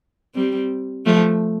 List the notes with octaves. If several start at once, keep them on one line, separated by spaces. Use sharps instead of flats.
G3 C4
F3 A3